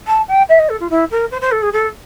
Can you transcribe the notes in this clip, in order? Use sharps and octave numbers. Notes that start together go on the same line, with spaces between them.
A5
G5
E5
D#5
A4
F4
E4
A#4
C5
C5
A4
G#4
A4